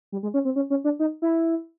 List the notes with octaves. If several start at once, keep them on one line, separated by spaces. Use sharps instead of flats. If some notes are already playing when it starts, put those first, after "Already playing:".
G3
G#3
C#4
C4
C#4
C#4
D4
D#4
E4